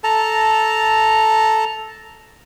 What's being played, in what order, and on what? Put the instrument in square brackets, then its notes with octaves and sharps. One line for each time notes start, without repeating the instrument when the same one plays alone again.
[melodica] A4 A5 A#5